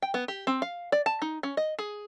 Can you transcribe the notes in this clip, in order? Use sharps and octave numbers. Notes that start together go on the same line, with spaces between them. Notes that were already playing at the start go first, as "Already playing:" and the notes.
G5
B3
G4
C4
F5
D5
A5
D#4
C#4
D#5
G#4